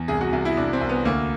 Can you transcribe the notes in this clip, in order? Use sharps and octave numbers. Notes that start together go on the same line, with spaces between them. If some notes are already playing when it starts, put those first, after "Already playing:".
Already playing: E2
C2 G#4
F#4
C2
E4
C2 D4
C4
C2
B3
D2 A#3